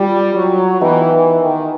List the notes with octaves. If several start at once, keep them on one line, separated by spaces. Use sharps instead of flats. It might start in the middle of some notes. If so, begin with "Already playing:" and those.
Already playing: G3 C4 F4
F#3
E3 B3 D#4 G4
E3
D#3